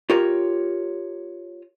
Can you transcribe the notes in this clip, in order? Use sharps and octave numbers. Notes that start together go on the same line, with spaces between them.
F4 G4 A#4 C#5